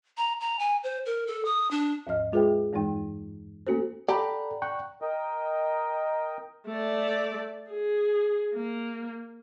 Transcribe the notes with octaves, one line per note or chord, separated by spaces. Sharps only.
A#5
A#5
G#5
C5
A#4
A4
D#6
D4
D#2 G#2 F3 D#5 F6
G#3 F4 G#4 B4 E5 G5
E2 G2 E3 G#3 D#4 G5
A3 A#3 C#4 F#4 A4 C5
G4 A4 D5 F#5 G5 A#5 B5
G5 C#6 F#6
A#4 D#5 G5
A3 D5
G#4
A#3